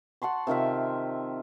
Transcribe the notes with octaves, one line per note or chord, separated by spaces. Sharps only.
F#5 A5 C6 C#6
C3 D#3 F4 E5